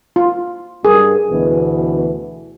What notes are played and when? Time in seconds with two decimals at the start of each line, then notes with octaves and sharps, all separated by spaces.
0.16 F4
0.85 G2 G#4 A#4
1.30 D2 B2 E3